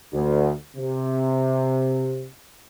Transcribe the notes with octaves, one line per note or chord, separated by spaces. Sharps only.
D2
C3